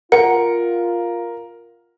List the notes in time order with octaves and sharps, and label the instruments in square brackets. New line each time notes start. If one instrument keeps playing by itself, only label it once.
[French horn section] F4 [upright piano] A#4 [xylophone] F#5